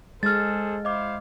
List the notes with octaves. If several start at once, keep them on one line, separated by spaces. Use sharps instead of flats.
G#3 G#4 A4 C5 F6 A6
E4 C5 D#5 F5 D6